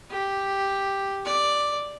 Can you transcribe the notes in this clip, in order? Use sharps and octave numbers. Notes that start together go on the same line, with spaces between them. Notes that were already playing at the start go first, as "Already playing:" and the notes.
G4
D5